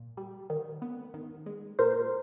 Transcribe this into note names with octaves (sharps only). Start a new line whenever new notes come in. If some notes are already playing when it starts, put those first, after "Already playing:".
Already playing: A#2
G3
D#3
B3
D#3
G#3
A#2 A#4 C5